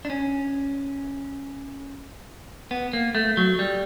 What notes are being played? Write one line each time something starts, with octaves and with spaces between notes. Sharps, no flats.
D4
C#4
B3
A#3
A3
F#3
G3